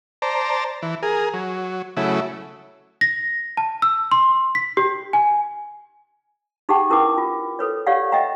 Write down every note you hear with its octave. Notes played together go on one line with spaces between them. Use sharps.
C5 D5 A5 A#5
E3
G#4 A#4
F#3
C#3 F#3 A3 E4
A#6
A5
E6
C6
B6
G4
G#5
D#4 G4 G#4 F#5 G5 A5
C#4 E4 A#4 B4 G5 D6
F4
A4 B4 C#5
G4 C#5 D5 F5 F#5
D#5 E5 F#5 G5 A#5